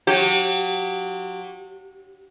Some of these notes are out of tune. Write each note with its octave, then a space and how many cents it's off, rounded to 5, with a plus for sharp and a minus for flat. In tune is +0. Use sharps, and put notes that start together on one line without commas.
F#3 -35 G4 -35